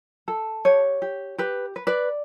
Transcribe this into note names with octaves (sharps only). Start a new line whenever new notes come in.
A4
G4 C#5
G4
G4 B4
B4
B4 D5